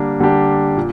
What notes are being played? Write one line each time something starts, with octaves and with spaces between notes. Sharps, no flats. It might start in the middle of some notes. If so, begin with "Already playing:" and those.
Already playing: D3 G3 A#3 D4 G4
D3 G3 A#3 D4 G4
A#2